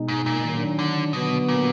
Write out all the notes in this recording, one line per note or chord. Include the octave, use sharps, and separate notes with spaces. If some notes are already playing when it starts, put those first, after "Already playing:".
Already playing: B2 G#3 D#4
G#2
A#2
D#3 F#3 D4
D3
B2 D3 F#3 B3
A#2